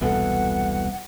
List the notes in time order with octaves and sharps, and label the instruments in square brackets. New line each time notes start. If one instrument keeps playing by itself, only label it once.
[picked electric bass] E1 C2 B2 [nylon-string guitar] E3 B3 A4 [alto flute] F#5